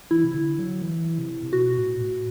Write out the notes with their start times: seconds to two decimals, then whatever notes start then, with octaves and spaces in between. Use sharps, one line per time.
0.11 E3 E4
0.24 C3
0.34 D3
0.59 F#3
0.82 E3
1.18 C3
1.43 C3
1.53 B2 F#4
1.77 A2
2.01 A2